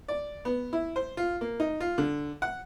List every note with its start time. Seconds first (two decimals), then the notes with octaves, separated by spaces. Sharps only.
0.08 D5
0.45 B3
0.73 E4
0.96 C5
1.17 F4
1.41 A#3
1.60 D#4
1.80 F4
1.98 D3
2.42 F#5